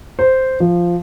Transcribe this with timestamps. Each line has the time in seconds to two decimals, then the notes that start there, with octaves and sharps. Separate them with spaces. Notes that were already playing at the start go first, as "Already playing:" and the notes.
0.19 C5
0.60 F3